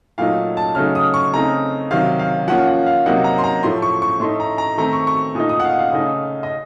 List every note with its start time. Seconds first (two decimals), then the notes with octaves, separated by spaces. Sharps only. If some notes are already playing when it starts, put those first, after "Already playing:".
0.18 A#2 F#3 A3 D#4 F5
0.57 A5
0.75 C#3 F#3 A3 D#4 F6
0.95 D#6
1.14 C#6
1.33 C#3 A3 C4 D#4 A#5
1.91 C3 D#3 F#3 F5
2.19 F5
2.48 F3 A#3 C#4 F4 F#5
2.67 F#5
2.86 F5
3.06 C3 F#3 A#3 D#4 F#5
3.24 A#5
3.38 C6
3.44 A#5
3.63 A2 F3 A3 C6
3.82 C#6
4.02 C#6
4.20 A2 A3 D#4 C6
4.40 A#5
4.58 A#5
4.77 D#3 A3 C4 A#5
4.93 C#6
5.07 C#6
5.35 A#2 A3 D#4 D#6
5.49 D#6
5.60 F#5
5.64 F5
5.79 F5
5.92 C#3 A3 D#4
6.43 D#5